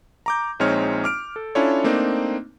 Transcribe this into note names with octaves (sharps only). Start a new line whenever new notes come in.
A#5 D6 G6
A#1 G#3 C4 D#4 C#5 F6
D6 F6 D7
A4
C#4 D4 E4 F4 A4 C#5
A3 A#3 C4 D4 D#4